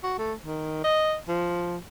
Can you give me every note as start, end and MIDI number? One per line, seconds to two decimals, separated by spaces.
0.03 0.16 66
0.18 0.33 57
0.42 0.83 51
0.84 1.15 75
1.28 1.77 53